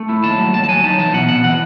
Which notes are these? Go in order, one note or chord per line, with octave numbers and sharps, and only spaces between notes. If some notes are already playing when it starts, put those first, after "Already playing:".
Already playing: A3
E4
D#2 A5
F#3
D#2 A5
A5
F#3 G#5
D#4 A5
E3 A5
B2 F#5
B2 F#5
E3 F#5